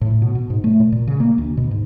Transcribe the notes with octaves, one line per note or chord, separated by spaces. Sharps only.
A2
B2
B2
G#2
A3
A#2
A#2
C#3
A#3
D2
B2
G#2